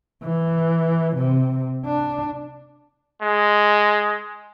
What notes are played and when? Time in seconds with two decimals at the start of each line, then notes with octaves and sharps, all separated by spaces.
0.23 E3
1.16 C3
1.86 D4
3.22 G#3